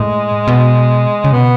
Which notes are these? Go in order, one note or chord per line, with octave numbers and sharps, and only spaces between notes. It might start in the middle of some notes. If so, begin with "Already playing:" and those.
Already playing: A2 G#3
B2
C#3
B2 B3